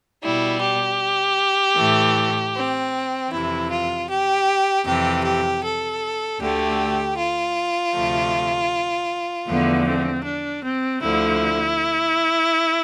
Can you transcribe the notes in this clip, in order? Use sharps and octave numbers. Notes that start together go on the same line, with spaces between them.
B2 G3 E4
G4
A2 E3 A3
C4
F2 C3 E3 E4
F4
G4
F2 C3 E3 G4
G4
A4
D2 D3 A3 G4
F4
D2 C3 F3 A3
E2 D3 F3 A3 B3
C4
D4
C4
D2 D3 F3 E4